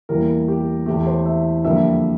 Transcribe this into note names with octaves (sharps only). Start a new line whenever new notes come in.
E2 E3 G3 A#3 A#4
G4
E2 E3 A3 G4
C5
E5
F2 D3 G3 A#3 E5